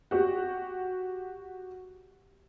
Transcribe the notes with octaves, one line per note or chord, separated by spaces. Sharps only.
F#4 G4